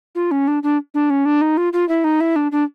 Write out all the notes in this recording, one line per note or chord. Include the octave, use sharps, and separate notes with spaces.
F4
C#4
D4
D4
D4
C#4
D4
D#4
F4
F4
E4
D#4
E4
D4
D4